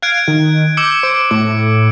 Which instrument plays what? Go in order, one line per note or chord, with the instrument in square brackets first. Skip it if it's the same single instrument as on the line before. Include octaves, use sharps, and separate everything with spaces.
[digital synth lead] F5 [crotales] F#6 G#6 D7
[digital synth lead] D#3
[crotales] D6 E6 C#7 [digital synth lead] G6
[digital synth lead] C5 [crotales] D7
[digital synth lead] A2 [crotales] D6